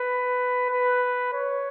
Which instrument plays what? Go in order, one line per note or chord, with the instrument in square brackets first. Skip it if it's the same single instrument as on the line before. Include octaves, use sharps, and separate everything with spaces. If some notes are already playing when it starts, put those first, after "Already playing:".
Already playing: [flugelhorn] B4
B4
C#5